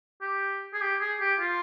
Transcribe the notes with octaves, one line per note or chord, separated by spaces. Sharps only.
G4
G#4
G4
G#4
G4
F4